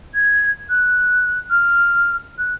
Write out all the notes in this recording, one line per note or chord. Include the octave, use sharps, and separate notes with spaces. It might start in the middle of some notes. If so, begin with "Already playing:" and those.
G#6
F#6
F6
F#6